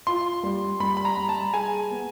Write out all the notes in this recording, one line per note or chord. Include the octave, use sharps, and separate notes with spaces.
F4 C6
G3
G3 B5
B5
A#5
G3
A5
G#4 G#5
B3